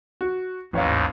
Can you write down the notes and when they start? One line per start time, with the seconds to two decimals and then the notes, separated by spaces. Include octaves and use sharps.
0.21 F#4
0.73 A1 D#2 G#2 C#5 F5